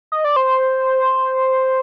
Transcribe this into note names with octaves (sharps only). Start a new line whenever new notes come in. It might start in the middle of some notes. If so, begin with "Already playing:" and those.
D#5
D5
C5